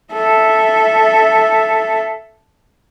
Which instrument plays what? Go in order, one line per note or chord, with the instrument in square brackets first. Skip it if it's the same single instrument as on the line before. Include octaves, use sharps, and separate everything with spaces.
[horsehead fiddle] A4 E5